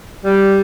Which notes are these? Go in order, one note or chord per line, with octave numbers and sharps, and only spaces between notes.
G3